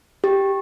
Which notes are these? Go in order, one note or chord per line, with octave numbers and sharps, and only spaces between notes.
G4